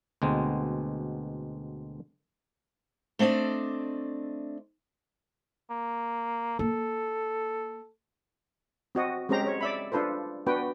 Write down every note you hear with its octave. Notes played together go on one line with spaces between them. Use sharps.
D2 B2 G#3 B3 C4
A3 C4 D4 D5 D#5
A#3
A#3 A4
C4 F#4 D#5
G#3 C4 C#4 G4 C5 A#5
C#5
D5 E5 B5
D4 F4 A4 B4 C5
B3 D4 F#4 B4 G5